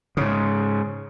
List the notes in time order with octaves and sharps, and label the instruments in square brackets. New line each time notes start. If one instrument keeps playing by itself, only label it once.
[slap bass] G#2 C#3